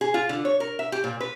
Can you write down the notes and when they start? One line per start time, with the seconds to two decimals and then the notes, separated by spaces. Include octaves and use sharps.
0.01 G#4
0.14 F4
0.29 D3
0.45 C#5
0.60 A#4
0.79 E5
0.92 G4
1.04 A#2
1.20 B4